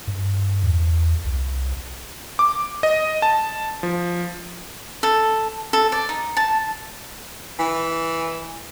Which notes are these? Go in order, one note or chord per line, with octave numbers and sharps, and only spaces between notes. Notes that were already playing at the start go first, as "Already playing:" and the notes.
G2
E2
C2
D6
D#5
A5
F3
A4
A4
D5
D#4
A5
E3